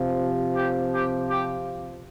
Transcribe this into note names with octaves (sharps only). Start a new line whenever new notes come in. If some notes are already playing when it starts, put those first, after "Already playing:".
Already playing: C3 F3
G4
G4
G4